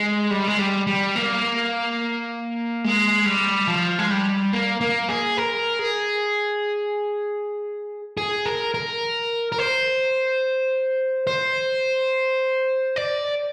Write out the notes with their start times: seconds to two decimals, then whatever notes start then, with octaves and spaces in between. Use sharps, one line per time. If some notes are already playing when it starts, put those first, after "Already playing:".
Already playing: G#3
0.31 G3
0.47 G#3
0.59 G3
0.87 G3
1.16 A#3
2.84 G#3
3.26 G3
3.68 F3
3.99 G#3
4.11 G3
4.53 A#3
4.81 A#3
5.09 G#4
5.37 A#4
5.79 G#4
8.17 G#4
8.46 A#4
8.74 A#4
9.52 A#4
9.58 C5
11.27 C5
12.96 D5